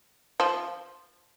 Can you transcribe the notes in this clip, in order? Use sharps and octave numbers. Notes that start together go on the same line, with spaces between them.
F3